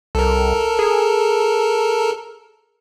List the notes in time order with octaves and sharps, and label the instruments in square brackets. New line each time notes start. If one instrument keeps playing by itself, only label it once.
[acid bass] C2 [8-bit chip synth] A4 A#4
[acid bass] G#4